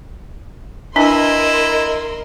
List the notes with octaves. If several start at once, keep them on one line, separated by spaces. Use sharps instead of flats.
E3 D4 E4 A#4 D#5 C6